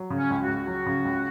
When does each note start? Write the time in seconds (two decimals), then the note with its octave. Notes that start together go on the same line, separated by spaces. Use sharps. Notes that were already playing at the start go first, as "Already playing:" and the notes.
Already playing: F#3
0.10 C#3
0.18 C#4
0.30 C#2
0.43 F#4
0.48 C#2
0.67 F#3
0.86 C#3
1.05 C#2